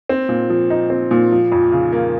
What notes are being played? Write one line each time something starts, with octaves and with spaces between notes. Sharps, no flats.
C4
A#2
F3
D#4
C4
A#2
F3
F2
C#3
A#3